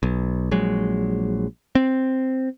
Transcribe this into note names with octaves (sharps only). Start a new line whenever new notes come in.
B1
A#1 F#3 G#3
C4